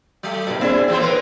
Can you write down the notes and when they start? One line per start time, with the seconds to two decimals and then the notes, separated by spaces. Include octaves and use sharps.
0.23 F#3 A3
0.47 G2 C3 D#3
0.61 C4 D4 E4 G#4
0.88 A2 E3 C4 C5
1.00 A3 A#4 B4 C#5